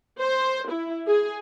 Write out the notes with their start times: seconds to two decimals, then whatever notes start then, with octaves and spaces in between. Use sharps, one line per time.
0.20 C5
0.71 E4
1.07 G#4